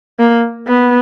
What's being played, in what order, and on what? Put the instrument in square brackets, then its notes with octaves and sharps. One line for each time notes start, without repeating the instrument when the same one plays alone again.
[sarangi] A#3
B3